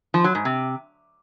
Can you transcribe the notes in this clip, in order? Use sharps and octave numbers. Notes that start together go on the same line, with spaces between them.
F3
F#3
G#2
C3